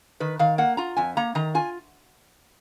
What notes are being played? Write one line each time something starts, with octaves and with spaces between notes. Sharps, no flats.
D#3 B4
D#3 F5
A#3 F#5
F4 A#5
F2 G#5
A#3 A#5
D#3 A#5
F4 G#5